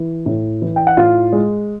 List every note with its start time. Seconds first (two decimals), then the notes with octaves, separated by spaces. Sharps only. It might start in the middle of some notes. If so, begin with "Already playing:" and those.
Already playing: E3
0.26 A2
0.62 E3
0.76 G5
0.87 F#5
0.97 A2 F4 F5
1.32 G#3